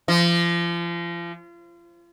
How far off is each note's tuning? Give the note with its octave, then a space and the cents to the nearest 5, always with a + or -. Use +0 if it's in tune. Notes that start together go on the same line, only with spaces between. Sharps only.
F3 -35